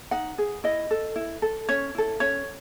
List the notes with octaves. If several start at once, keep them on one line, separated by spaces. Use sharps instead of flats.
D#4 F#5
G#4
E4 D#5
A4
E4
A4
C#4 C#5
E4 A4
C#4 C#5